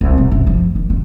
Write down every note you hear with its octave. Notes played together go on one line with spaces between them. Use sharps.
C2
C3
F#2
F3
D#3
D3